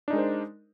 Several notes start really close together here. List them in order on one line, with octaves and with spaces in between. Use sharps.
D4 D#4 G#3 A#4 C5